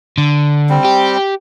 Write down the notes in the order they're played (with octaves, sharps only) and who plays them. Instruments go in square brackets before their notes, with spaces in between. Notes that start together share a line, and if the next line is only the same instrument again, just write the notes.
[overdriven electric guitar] D3
[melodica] G3 C4
[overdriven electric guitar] G4